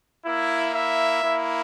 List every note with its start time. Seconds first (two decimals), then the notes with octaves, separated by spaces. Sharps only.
0.24 A#3 E4
0.72 E4 E5
1.21 A#3 E4